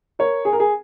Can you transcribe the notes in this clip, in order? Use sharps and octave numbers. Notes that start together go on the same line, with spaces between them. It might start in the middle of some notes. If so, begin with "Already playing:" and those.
A#4 C#5
G#4
A#4
G#4